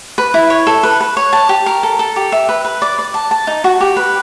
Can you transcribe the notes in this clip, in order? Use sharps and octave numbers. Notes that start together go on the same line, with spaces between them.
B4
E4
C#5
A4
B4
B4
C#5
A5
G4
A#4
A4
A4
G4
E5
B4
B4
D5
D5
A5
A5
D#4
F#4
G4
B4